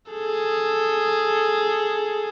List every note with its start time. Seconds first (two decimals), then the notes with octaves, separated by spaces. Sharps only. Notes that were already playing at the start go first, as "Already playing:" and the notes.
0.12 G#4 A4